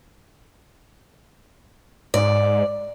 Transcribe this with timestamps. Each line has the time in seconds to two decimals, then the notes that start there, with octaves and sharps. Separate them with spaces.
2.14 G#2 D5